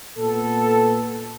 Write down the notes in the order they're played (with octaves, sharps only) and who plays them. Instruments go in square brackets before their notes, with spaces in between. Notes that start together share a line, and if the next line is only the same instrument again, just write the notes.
[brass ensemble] A#2 B3 A4